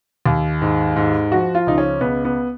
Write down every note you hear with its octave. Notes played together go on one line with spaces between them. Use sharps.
D#2
G#2
G#2
F3 F#4
F4
C#2 D#4
C#4
C#2 B3
B3